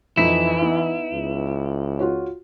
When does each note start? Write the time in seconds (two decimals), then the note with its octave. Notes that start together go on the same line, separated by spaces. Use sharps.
0.17 F2 E3 D#4 E4 B6
0.61 B3 D#4
1.13 C#2
1.99 F4 F#4 C#5